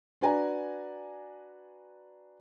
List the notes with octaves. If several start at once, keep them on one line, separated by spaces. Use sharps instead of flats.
D4 F#4 B4 D5 G#5 A#5